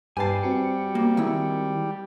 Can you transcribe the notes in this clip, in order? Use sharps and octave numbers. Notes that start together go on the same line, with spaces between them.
G2 G3 B4 G#5 A5 C7
C4 F#4 C#7
A#3
D#3 G#3 E4